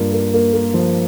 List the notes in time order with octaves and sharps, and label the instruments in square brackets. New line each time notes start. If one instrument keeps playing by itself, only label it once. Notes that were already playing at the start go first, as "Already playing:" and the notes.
Already playing: [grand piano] G2 A#3 F4
A#3
A#3
A#3
F3